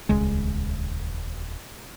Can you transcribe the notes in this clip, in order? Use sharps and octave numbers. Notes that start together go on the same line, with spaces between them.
D#1 C#2 G#3